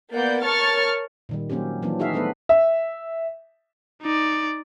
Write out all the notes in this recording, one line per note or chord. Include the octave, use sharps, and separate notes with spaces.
A#3 B3 D5 F#5 G6
A#4 C#5 A5 C#6 F6 A6
A#2 D#3 G3
F#3 A#3 C4 C#4 G4
E3 F#3 A#3 C4 D4
D#4 F#4 G#4 E5 F5
G3 A3 B3 C4 D4 B4
E5
D#4 D5